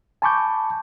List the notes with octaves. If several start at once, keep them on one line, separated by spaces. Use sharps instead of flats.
G#5 A5 B5 C#6 D6 G6